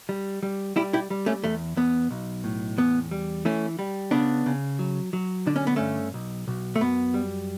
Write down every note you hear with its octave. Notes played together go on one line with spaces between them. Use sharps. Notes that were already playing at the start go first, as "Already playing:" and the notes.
G3
G3
G3 E4 G4
E4 G4
G3
A3 C#4
E2 A3
E2 B3
B1
A2
E2 B3
G3
E3 A3 C#4
G3
C#3 B3 D4
C#3
F#3
F#3
D3 D4
C#4
B3
G2 A3 C#4
B1
B1
A3
F#2 B3
G3